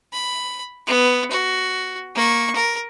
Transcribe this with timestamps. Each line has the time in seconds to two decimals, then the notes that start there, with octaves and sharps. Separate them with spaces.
0.13 B5
0.87 B3
1.31 F#4
2.16 A#3 C#6
2.56 A#4